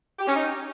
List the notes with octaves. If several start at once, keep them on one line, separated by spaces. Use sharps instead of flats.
G4
C#4
D#4